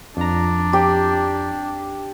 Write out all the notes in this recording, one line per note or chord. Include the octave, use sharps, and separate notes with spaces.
F2 D4 A#5
G4 G5